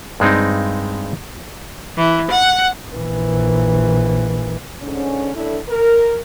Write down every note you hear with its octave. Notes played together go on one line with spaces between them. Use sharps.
G2 G#3 C4 D#4
E3
F#5
A#1 E3
G#2 D3 C#4
A2 D4 E4 A4
A#4